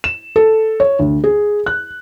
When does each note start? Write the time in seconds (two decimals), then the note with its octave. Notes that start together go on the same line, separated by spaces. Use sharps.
0.04 E7
0.36 A4
0.80 C#5
0.99 D2
1.24 G#4
1.66 F#6